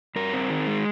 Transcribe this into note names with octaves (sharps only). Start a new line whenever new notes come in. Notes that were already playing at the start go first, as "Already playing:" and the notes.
G2 A#4
C4
D#3
G#3